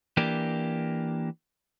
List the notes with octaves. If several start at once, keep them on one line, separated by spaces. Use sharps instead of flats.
E3 A#3 D4 G4